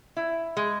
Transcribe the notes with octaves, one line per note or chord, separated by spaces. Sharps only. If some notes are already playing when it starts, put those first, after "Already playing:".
E4
G#3